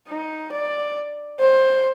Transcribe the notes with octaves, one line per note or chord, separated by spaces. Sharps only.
D#4
D5
C5